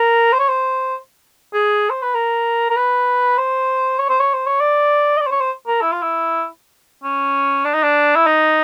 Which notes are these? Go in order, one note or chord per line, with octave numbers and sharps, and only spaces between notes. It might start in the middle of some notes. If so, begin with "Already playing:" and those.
Already playing: A#4
C5
C#5
C5
G#4
C5
B4
A#4
A#4
B4
C5
C#5
C5
C#5
C5
C#5
D5
D#5
D5
C5
C#5
C5
A#4
E4
F4
E4
C#4
D4
D#4
D4
E4
D#4